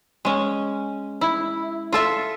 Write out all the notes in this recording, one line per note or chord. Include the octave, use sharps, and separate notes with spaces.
G#3 C#4
E4
F4 A4 E5